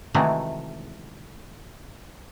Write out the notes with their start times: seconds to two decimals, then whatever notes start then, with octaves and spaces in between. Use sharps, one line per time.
0.14 C3 D#3 E3 F#3 G#3 A3